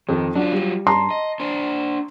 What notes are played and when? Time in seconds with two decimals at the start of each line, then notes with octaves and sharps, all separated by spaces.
0.09 F2 D#3
0.35 F#3 D4 F4
0.52 G3
0.87 G2 A5 A#5 C6
1.11 D#5
1.40 D4 C5